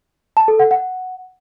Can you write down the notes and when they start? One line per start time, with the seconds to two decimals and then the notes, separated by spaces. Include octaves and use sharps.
0.37 A5
0.48 A4
0.59 F#5
0.71 F#5